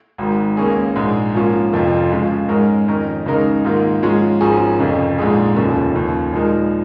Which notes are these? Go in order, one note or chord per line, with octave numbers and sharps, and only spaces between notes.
G#1 G#2 D#3
C#2 C#3 A#3 C#4 G#4
A#1 G#2 G#3
G#2 F3 A#3 C#4 F4
F1 F2 F3 C#4 F4
C#3 F3 G#3
G#2 G#3 C#4 A#4
F2 D#3 C#4 A#4
C#2 C#3 G#3 D#4 A#4
G#2 D#3 A#3 F4
G#2 F3 G#3 C#4 F4
G#1 G#2 F3 C#4 G#4
F1 F2 C#3
A#1 G#2 G#3 F4 G#4
F1 D#2 C#3 F3 C#4
D#2 C#3 F3
A#2 F3 G#3 D#4 A#4